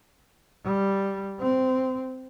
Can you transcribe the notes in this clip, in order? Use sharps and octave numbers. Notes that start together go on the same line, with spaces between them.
G3
C4